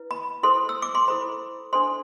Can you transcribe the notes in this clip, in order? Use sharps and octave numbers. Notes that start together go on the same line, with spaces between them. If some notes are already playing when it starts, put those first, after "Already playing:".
Already playing: E4 B4
B5
E4 A4 C5 C6
E6
D6
C6
E4 A4 C5 B5
D4 A4 C5 C6